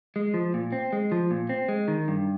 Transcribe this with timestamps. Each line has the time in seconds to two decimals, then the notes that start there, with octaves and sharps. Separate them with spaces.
0.16 G#3
0.34 F3
0.54 A#2
0.72 C4
0.93 G#3
1.12 F3
1.31 A#2
1.49 C4
1.69 G#3
1.88 D#3
2.08 G2